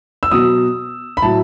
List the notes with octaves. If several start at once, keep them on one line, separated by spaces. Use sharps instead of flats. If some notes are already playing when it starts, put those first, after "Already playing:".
E6
B2 F#3 D#6
B5
A2 F#3 A5